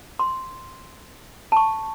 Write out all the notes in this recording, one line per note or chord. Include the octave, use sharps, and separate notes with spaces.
C6
A5 C#6